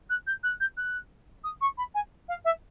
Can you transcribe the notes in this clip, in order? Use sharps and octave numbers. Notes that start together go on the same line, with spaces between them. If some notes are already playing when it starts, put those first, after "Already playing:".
F#6
G6
F#6
G6
F#6
D#6
C#6
B5
G#5
F5
E5